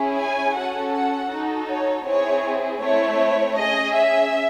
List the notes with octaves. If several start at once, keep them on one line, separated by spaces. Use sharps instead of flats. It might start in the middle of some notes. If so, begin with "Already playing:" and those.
Already playing: C#4 E4 G#4
G#5
C#4 F#4 A4 F#5
F#5
D#4 F#4 A4
C#5
C4 E4 G#4 C#5
A3 C4 E4 C#5
C#4 G#4 D#5
E5